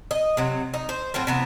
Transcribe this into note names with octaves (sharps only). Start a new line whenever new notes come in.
D#5
C3 F#3
D#4
C5
A2 F#3 C4 F4
C3 E3 B3